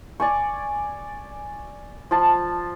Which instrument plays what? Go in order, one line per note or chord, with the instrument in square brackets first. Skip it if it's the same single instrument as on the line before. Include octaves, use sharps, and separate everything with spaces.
[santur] D5 G#5 C#6
F3 A5